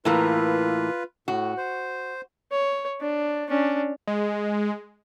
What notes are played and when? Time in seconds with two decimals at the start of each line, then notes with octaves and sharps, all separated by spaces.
0.05 A2 E3 A#3 F4 B4
1.28 A2 F#4
1.57 C5
2.52 C#5
3.00 D4
3.49 C#4 D4
4.07 G#3